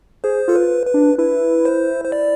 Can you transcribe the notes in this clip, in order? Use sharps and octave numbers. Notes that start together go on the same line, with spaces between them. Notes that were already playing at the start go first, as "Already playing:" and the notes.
G#4 C5
F4 A4
B4
B4
D4
E4 B4
C5
C5
D5